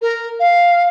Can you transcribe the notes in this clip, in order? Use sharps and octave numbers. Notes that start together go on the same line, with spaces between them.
A#4
F5